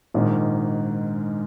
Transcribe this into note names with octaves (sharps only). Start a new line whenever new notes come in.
A#1 G#2 D#3